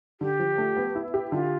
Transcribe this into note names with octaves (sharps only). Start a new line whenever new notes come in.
D3 G4
F3
A3
B3
E4
G4
D3 F4